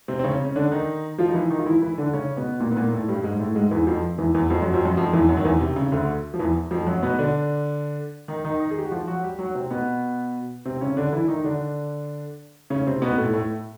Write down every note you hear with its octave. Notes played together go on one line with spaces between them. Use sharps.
C3 C4
C4
C#3 C#4
C#4
D3 D4
D#3 D#4
F3 F4
D#4
E3 E4
D#3 D#4
F4
E3 E4
E3 E4
D3 D4
C#3 C#4
B2 B3
A#2 A#3
B3
A#2 A#3
A2 A3
G2 G3
G#2 G#3
A2 A3
G#2 G#3
E2 E3
F2 F3
E2 E3
E2 E3
F2 F3
F#2 F#3
F2 F3
F#2 F#3
F2 F3
E2 E3
F#2 F#3
D#3
E2 E3
C3
C#3
D2 D3
F3
E2 E3
F2 F3
F#2 F#3
B2 B3
D3 D4
D#3 D#4
D#3 D#4
D#3 D#4
G#4
G4
F#4
F3 F4
F#3 F#4
G3 G4
F#3 F#4
C3 C4
B2 B3
C3 C4
C#3 C#4
D3 D4
E3 E4
D#3 D#4
D3 D4
C#3 C#4
C3 C4
B2 B3
A2 A3
A2 A3